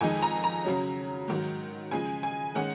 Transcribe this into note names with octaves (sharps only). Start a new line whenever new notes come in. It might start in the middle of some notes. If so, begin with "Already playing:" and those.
F2 D#3 G#3 D#4 G#5
A#5
A#5
C#3 F#3 C#4
G#2 D#3 F#3
C#3 F3 G#3 G#5
G#5
D#3 G#3 C#4 F#5